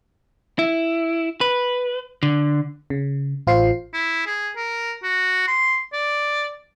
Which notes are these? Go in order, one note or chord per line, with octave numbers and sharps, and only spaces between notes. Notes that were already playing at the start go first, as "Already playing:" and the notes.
E4
B4
D3
C#3
A1 F4 C5 C7
E4
G#4
A#4
F#4
C6
D5